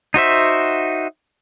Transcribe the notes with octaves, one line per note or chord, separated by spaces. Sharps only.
D#4 F#4 C5 E5